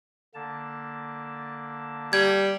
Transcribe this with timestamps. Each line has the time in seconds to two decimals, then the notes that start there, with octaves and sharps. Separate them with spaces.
0.34 D3 A#3 A5
2.13 G3 G#6